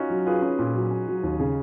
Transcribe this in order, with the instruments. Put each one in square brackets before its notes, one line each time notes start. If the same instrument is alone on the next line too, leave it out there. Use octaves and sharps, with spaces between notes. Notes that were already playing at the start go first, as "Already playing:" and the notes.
Already playing: [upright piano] C#4 D#4 F4 F#4
[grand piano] F#3
[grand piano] F4 [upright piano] G#4 B4
[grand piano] C#4
A#2
F#3
C#4
F#3
D#2
C#3